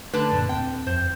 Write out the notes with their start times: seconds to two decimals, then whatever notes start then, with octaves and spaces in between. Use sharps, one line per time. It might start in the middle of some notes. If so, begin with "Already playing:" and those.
0.13 D3 A3 D4 B4
0.32 F#2 A#2
0.49 D#2 C4 G5
0.87 F2 C5